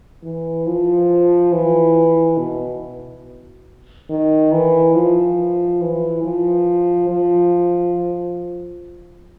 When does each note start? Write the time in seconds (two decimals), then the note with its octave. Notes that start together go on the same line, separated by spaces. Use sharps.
0.24 E3
0.67 F3
1.52 E3
2.38 B2
4.09 D#3
4.52 E3
4.95 F3
5.81 E3
6.24 F3
7.10 F3